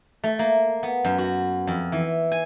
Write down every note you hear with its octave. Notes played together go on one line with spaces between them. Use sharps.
A3
A#3
B3
F#2
F#4
F2
E3
G#5